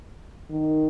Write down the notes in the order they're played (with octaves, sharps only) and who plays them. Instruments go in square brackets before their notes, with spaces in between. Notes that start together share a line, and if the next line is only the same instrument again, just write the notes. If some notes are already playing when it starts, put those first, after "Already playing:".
[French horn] D#3